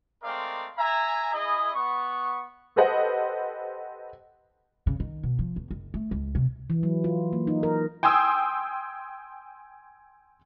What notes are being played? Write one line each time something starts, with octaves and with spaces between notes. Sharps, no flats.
G#3 A3 C4 A#4 D5 F5
E5 G#5 A#5
E4 G#4 D#5
B3 C#6
G4 A4 B4 C5 D#5 F#5
C#3
D#3
B2
F3
E2
F#1
A3
C#2
C3
E3
F#3
F4
A#3
D#4
A#4
G5 G#5 C6 D#6 E6